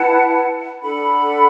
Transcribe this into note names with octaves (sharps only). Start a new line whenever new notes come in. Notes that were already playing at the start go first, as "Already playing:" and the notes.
Already playing: E4 B4 F#5 A5
D4 A4 F#5 B5